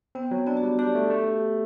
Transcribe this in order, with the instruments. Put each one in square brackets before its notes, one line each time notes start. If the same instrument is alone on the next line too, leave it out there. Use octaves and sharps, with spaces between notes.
[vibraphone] B3 [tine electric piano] C4
[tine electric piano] F#3
[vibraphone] B3 [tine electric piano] D4
[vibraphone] F#4
[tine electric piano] G3
[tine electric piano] D4 [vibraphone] G4
[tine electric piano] A3
A3